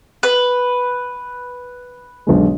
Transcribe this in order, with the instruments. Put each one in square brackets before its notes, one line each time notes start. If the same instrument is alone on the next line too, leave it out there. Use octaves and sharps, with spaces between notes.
[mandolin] B4
[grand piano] B1 D3 G#3